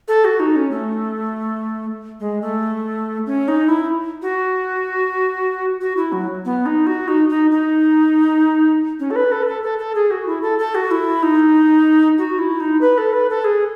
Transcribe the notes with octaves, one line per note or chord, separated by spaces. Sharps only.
A4
F#4
D#4
C#4
A3
G#3
A3
C#4
D#4
E4
F#4
F#4
E4
F#3
B3
D#4
F#4
D#4
D#4
D#4
C#4
A4
B4
A4
B4
A4
A4
A4
G#4
F#4
E4
A4
A4
F#4
E4
D#4
F#4
E4
D#4
B4
A4
B4
A4
G#4